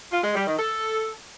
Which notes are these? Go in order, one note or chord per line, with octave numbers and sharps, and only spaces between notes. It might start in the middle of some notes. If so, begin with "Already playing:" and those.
F4
G#3
G3
D#3
A4